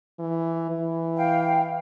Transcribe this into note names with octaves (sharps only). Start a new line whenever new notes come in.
E3
E3
F5 G5